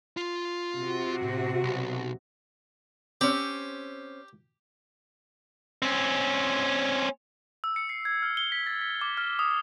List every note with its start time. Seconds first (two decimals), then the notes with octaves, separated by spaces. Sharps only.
0.17 F4
0.78 C3 F#4
1.22 A2
1.63 B1
3.21 C4 C#4 G4
5.82 C4 C#4
7.64 E6
7.76 C#7
7.89 C7
8.05 G#6
8.23 F6
8.37 G7
8.52 B6
8.67 A6
8.81 B6
9.01 D6
9.17 F6
9.39 D#6